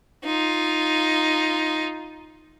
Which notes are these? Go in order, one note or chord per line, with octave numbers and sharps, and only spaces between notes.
D#4 F4